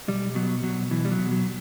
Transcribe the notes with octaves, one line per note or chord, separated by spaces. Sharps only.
B1 G3
B2 F#3
B2 F#3
B2 E3
G3
F#3
B2
F#3